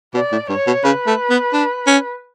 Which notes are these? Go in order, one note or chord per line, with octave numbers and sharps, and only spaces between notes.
B2 D5
A2
G2 C#5
B2
C#3 B4
A3
B3
D4
C#4